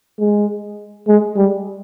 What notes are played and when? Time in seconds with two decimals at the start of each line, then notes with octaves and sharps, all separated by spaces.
0.20 G#3
1.08 G#3
1.36 G3